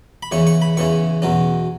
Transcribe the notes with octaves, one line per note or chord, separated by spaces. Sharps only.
B5
E2 C#3 E3 C#4 C#6
C#6
B5
E2 C#3 E3 C#4 C#6
E2 B2 F#3 C#4